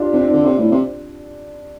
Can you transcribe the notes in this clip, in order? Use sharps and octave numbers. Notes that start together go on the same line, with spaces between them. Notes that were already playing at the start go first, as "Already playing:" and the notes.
Already playing: D4 F4 G4
C3 D4
C4
D3 D4
C3
A2
C3